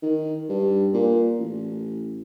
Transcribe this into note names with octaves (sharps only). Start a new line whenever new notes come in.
D#3
G2
A#2
A1